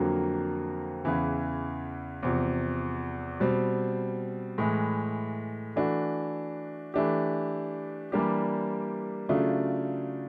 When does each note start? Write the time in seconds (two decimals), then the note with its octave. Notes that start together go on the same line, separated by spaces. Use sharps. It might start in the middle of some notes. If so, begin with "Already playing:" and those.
Already playing: F2 D3 F#3 A#3
1.05 E2 C#3 E3
2.23 E2 C3 F3
3.40 B2 G3 C4
4.58 A2 E3 G#3
5.76 E3 A3 D4 F#4
6.94 E3 A3 D4 G4
8.12 E3 G3 A#3 D4 G4
9.29 C#3 F#3 A3 D4 F4